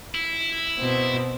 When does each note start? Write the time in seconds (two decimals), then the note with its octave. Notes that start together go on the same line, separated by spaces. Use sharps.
0.15 E4
0.79 B2 C4